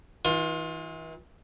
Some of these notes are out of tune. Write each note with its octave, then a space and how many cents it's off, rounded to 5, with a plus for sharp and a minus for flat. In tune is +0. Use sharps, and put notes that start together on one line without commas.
E3 -40 F4 +25